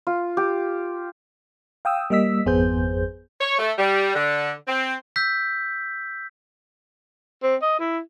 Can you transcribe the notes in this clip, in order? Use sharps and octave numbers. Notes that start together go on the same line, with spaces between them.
F4
G4
F5 G5 D#6 E6
G3 A#3 D#5 E6 B6
G#1 F2 B3 G#4 C5 G6
C#5
A3
G3
D3
C4
E6 G6 B6
C4
D#5
E4